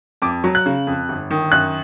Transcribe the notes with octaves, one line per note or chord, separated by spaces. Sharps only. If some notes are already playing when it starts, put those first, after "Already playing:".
F2 D6
F#3
F#6
C#3
F2
G1
D#3
F#2 F#6